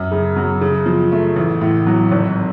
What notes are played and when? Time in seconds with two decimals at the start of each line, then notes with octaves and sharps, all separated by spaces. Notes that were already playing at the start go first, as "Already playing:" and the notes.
Already playing: F#2
0.11 C#3
0.36 F#3
0.61 C#3
0.86 F3
1.12 A3
1.36 A1
1.61 A2
1.87 F#3
2.11 G#1